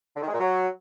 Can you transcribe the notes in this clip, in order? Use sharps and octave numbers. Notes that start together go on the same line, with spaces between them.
D3
D#3
G#3
A#2
F#3